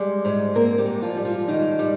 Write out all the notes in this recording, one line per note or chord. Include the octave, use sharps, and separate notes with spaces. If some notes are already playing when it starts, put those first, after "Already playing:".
Already playing: G3 G#3 G#4
G#2
A#3 C4 A#4
G3 G4
G#2
F3 F4
G3
F3 F4
G#2 D#3 D#4
G3